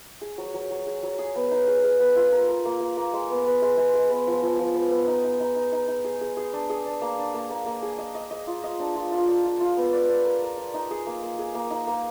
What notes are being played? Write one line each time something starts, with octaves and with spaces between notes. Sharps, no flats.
G#4
F#3
F#3
F#3
G#4
F#3
G#4
B3
D#4
G#4
G#4
B3
F4
A#4
A#4
A#3
A#3
A#3
G#3
B3
B3
G#3
G#3
G#3
B3
F3
F3
F3
B3
B3
D#4
D#4
D#4
D#4
D#4
D#4
G#4
G#4
G#4
D4
G#4
D4
A#3
D4
A#3
A#3
A#3
G#4
D#5
D#5
D#5
F4
D#5
D4
F4
F4
D4
F4
F4
B3
D5
D5
A#4
A#4
D5
D#4
G#4
A#3
A#3
G#4
A#3
D#4
A#3